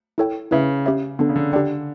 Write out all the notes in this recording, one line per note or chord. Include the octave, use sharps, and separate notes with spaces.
E4 A4 C#5 G5
C#3 E4 B4 E5
C#4 G4 C#5 E5
D3 B3 D4 A4
C#3
D3
D3 D4 G4 D5 G5